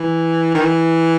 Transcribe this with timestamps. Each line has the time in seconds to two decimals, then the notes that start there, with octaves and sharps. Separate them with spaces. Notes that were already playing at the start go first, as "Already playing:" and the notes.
Already playing: E3
0.54 D#3
0.61 E3